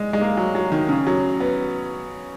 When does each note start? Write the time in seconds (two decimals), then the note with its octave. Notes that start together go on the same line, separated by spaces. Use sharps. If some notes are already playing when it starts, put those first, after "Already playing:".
Already playing: G#3
0.13 G#3
0.21 A#3
0.37 F#3
0.55 F#3
0.72 D#3
0.89 C#3
1.07 F#3
1.40 B3